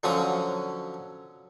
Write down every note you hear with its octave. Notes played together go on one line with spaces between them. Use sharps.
D3 F3 F#3 C#4 F5 D#6